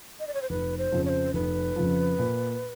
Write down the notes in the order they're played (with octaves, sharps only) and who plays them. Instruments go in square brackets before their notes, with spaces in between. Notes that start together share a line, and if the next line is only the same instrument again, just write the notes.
[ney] D#5
D5
C#5
C5
[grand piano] F1 [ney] B4
[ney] C5
[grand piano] F2 C#3 F3
[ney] C#5
C5
[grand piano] F1 [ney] B4
[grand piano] F2 C#3 F3
A#2